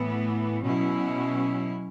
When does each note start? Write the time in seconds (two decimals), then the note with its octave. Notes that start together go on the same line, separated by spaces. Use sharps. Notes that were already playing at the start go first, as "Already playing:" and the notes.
Already playing: A2 E3 B3
0.63 B2 F#3 C#4 E4